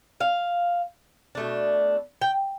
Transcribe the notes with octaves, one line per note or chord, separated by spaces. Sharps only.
F5
B2 A3 D4
G5